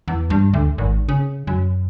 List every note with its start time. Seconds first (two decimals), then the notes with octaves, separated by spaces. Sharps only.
0.08 E2
0.30 G2
0.53 D2
0.78 G#1
1.09 C#3
1.47 F#2